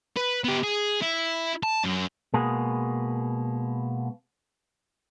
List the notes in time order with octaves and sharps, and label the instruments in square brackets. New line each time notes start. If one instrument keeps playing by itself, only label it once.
[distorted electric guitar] B4
B3 G4
G#4
E4
A5
F#2
[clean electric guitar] B2 G#3 A#3 B3 G#4